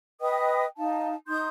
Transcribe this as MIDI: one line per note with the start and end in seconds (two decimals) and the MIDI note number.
0.20 0.65 71
0.20 0.65 75
0.20 0.65 79
0.20 0.65 87
0.78 1.14 63
0.78 1.14 77
0.78 1.14 81
1.28 1.48 63
1.28 1.48 84
1.28 1.48 87
1.28 1.48 91